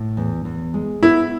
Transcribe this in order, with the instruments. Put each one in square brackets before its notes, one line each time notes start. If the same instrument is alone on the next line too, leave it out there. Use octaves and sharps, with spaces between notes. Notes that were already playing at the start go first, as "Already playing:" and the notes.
Already playing: [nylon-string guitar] A2
E2
E2
G#3
[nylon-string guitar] B3 [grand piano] E4